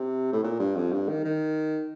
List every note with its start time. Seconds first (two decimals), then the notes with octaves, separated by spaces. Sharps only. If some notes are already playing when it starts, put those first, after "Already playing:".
Already playing: C3
0.32 A2
0.43 A#2
0.59 G2
0.75 F2
0.92 G2
1.08 D#3
1.24 D#3